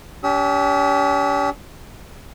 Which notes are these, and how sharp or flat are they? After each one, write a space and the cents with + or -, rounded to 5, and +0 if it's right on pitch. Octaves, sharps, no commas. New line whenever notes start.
C#4 +45 G4 +0 E6 -45